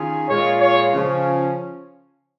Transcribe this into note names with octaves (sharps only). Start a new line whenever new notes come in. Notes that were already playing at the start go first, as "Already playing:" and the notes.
Already playing: D#3 C#4 F4 G#4
A#2 G#3 F4 C#5
C#5
C#3 F3 C#4